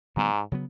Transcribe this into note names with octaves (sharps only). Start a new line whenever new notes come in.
G#2 C#3 F#3 B3
C#3 F#3 B3